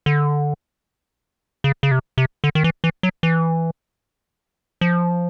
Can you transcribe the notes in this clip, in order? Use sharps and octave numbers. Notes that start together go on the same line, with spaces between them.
D3
C#3
C#3
C3
C3
D3
D#3
E3
E3
F#3
E3
F3